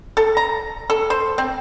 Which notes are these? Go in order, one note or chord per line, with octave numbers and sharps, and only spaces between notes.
A4
A#5
A4
C5
C4